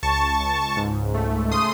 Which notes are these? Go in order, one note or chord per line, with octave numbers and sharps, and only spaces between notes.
C#2 A5 C#6
C#2
G#2
A3
C#3 C6 D#6